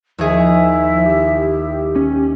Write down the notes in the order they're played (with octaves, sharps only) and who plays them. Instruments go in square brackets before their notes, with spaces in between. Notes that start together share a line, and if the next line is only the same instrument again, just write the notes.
[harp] D#2 G#4 [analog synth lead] F3 [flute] E4
[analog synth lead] G4
[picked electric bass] C#4